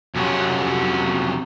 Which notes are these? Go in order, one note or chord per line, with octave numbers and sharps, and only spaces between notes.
F2 C3 F#3 C#4